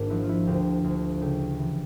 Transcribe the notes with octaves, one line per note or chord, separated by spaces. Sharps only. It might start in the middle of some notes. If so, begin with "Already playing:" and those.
Already playing: G#1 G#2 A#3 D4
F3 E4 F#4
F4
E4 F#4
D2 F4 G4
D2
C#3 G4 A4
E3